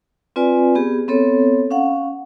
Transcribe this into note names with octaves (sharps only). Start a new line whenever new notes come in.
C4 F4 B4 D5 G#5
B3 G4 G#4
B3 C4 A4 C#5
C#4 F5 F#5